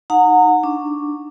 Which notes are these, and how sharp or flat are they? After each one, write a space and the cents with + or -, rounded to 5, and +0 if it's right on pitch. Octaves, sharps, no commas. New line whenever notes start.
D#4 +0 F#5 -20 A#5 -35
D4 +0 C#6 +0